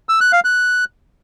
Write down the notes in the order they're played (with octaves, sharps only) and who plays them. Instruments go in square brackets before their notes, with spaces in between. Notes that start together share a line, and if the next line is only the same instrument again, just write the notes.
[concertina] E6
F#6
F5
F#6